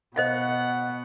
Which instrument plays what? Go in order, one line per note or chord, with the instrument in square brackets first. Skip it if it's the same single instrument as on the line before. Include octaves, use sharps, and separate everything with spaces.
[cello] B2 [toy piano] C5 D#5 F5 [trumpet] F#5